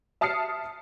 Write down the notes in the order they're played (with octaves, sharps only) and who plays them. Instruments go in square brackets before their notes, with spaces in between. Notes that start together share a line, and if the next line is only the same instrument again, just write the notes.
[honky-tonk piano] E5 A5 D#6 F6 C7 C#7